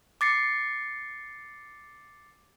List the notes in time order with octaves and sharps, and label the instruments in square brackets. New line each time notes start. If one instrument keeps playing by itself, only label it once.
[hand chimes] D6 A6 C7 C#7